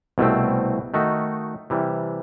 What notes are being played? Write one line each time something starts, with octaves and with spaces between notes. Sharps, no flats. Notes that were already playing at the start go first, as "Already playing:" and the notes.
C2 B2 A3 C4
D#3 A3 D#4 F#4
C3 E3 G3